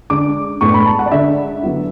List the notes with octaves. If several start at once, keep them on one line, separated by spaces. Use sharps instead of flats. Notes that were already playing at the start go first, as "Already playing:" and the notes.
D3 G#3 D4 D6
A2 G#3 B3 D4 C#6
B5
A5
F#5
D5
D3 G#3 D4 E5
D3 F#3 B3 E4